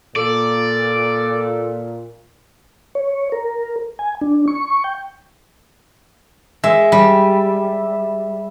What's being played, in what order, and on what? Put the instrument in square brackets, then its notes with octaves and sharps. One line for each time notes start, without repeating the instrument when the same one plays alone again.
[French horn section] A#2 [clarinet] A4 [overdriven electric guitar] D5
[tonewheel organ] C#5
A#4
G#5
D4
C#6
G5
[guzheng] G#3 [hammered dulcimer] E5
[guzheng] G3